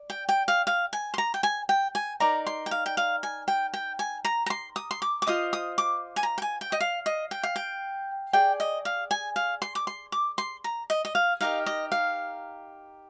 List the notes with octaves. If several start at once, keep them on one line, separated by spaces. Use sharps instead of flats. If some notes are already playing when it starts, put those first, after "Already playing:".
Already playing: D5
G5
G5
F5
F5
G#5
C6
A#5
G5
G#5
G5
G#5
D#4 A#4 D5 A#5
C6
G5
F5
G5
F5
G#5
G5
G5
G#5
A#5
A#5
C6
D#6
C6
D6
D6
F4 C5 D#5 D#6
D#6
D6
G#5
A#5
G5
G#5
G5
D#5
F5
D#5
G5
F5
G5
G#4 D5 G5
D#5
F5
G#5
F5
C6
D6
C6
D6
C6
A#5
D#5
D#5
F5
D#4 G4 A#4 D#5 F5
D#5
F5